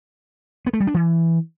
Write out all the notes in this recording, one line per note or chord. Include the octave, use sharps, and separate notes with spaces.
B3
A3
G3
D4
E3